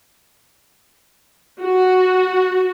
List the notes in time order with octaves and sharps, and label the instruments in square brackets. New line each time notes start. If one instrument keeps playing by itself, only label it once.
[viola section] F#4